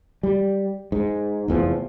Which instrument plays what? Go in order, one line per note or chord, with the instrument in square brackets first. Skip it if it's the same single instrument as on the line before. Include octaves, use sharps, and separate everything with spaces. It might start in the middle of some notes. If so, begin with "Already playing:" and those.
[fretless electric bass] G3
G#2
F1 E2 A2 F3